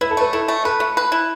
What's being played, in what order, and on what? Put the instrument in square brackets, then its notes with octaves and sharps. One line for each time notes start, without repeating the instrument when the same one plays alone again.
[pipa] E4 [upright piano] B4
[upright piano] A4
[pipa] A3 [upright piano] B4
[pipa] E4 [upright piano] A4
[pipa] A3
[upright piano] A4 [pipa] B4
[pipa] A3
B4
E4